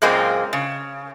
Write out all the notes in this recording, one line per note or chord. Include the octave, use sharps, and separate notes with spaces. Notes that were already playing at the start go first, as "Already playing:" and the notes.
F#2 A#2 G#3 A#3 C4
C#3